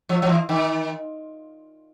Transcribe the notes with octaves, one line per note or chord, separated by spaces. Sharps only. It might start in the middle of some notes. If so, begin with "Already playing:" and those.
F3
F3
E3
D#3